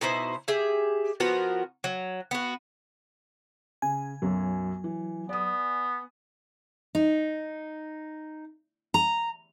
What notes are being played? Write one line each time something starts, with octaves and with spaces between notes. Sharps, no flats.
B2 D#4 E4 C5
G4 G#4 E5
F3 B3 F#4 A#4
F#3
B3 F#4
C#3 G#5
B1 F#2 F#3
E3
B3 D5 D#6
D#4
A#5